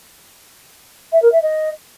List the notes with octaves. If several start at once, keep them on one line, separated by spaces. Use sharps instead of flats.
E5
A#4
E5
D#5